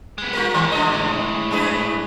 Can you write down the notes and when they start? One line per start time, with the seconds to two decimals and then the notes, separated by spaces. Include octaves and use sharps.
0.18 G#3 B3
0.33 F4 A#4
0.54 A2 D#3 G#3
0.72 C#3 D#5
1.51 F#2 G#4 B4